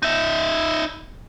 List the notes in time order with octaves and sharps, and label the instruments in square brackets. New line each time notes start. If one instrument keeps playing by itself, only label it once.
[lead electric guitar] D#4 E5